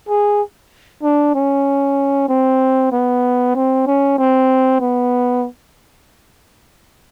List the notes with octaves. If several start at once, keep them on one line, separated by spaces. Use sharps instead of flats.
G#4
D4
C#4
C4
B3
C4
C#4
C4
B3